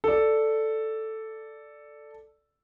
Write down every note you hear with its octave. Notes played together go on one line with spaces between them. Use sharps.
A4 D5